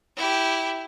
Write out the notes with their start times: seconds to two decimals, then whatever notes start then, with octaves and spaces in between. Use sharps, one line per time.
0.16 E4 G4